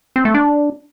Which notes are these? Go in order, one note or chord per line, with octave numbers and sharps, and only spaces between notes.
C4
A3
D4